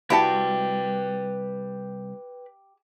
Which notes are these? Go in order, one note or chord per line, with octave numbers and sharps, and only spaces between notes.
C2 E4 F#4 G4 B4 G5 A5 B5